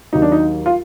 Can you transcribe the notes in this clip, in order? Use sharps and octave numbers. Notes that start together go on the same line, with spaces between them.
D#2 D#3 F#3 D#4
D4
D#4
F4